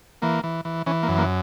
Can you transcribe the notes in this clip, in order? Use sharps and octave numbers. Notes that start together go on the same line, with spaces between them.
E3 A#3
E3
E3
E3 C#4
A#3
F#2
A#3